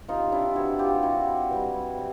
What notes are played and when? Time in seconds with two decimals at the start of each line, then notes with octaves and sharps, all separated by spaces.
0.08 C3 D#4 F4
0.32 D4 E4
0.56 E3 G3 E4 F#4
0.79 F4 G4
1.02 C3 E4 F#4
1.51 E3 G3
1.97 C3